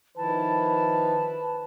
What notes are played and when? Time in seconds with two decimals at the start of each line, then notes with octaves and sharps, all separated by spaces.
0.17 D#3 F3 E4 B4 A5